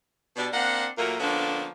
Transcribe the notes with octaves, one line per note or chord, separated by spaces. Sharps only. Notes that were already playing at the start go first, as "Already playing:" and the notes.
B2 G3 D4
A#3 C4 D4 F#5
A#2 F#3 A3 A#3
D3 F3 A#3 B3 C#4 D4